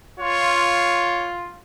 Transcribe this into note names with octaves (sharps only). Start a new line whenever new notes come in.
F4 C#5